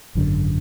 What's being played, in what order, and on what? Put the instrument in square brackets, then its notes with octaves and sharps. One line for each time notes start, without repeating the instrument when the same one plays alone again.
[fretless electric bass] G#1 F#2 D3